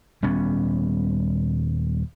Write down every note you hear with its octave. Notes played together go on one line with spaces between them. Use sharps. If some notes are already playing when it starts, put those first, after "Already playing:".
D#1 G3 B3 C#4